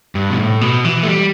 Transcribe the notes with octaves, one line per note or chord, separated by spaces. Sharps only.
G2
B2
A2
B2
E3
A3
G3